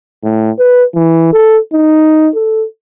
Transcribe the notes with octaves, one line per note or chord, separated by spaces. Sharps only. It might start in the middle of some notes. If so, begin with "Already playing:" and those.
A2
B4
E3
A4
D#4
A4